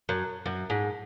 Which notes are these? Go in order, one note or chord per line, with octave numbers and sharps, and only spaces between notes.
F#2
F#2
G#2